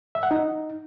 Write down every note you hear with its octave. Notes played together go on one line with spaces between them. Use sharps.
E5
F#5
D#4